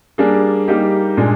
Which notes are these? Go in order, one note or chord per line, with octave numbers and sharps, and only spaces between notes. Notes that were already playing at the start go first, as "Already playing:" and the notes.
G3 A#3 D4 G#4
G3 A#3 D#4 G4
A#2 G#3 D4 G#4